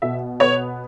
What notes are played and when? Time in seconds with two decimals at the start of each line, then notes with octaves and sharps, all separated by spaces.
0.02 B2 E5
0.40 B3 C#5